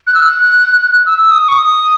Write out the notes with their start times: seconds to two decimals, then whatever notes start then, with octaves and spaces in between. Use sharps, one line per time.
0.07 F#6
0.15 E6
0.22 F#6
1.06 E6
1.31 D#6
1.48 C#6
1.55 D#6